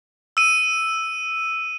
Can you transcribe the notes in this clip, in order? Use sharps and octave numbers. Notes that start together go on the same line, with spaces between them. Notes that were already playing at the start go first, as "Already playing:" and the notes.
E6 D#7